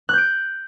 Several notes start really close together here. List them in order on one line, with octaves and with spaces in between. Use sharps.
F#6 G6 D7